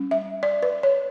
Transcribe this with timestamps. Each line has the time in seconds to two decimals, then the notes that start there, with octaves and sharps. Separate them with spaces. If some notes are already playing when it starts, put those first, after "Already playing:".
Already playing: G3 C#4
0.11 E5
0.43 D5
0.63 B4
0.83 C#5